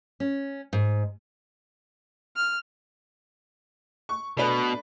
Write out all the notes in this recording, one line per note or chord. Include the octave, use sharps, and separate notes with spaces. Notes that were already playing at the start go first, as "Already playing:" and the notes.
C#4
G#2
F6
C#6
B2 A3 D4 B4